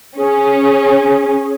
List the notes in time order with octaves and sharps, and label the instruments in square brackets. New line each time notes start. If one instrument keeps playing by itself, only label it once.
[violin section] C#4 [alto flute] G#4